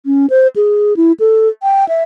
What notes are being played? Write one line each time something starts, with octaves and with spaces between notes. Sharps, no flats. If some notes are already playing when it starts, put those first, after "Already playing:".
C#4
C5
G#4
E4
A4
G5
E5